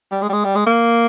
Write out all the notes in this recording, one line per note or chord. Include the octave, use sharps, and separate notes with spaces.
G3
G#3
G3
G#3
G3
G#3
A#3